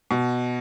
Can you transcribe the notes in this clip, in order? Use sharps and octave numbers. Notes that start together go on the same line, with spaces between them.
B2